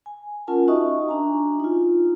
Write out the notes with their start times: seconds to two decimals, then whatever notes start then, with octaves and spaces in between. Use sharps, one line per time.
0.06 G#5
0.47 C#4 F4 A#4 F#5 A5
0.68 D#4 F#4 D#5 E5 C#6 D#6
1.08 D4 F#4 G#5 A#5
1.60 D#4 F4